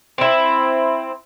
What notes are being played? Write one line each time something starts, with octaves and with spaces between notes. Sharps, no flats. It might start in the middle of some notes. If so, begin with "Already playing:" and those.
C4 E4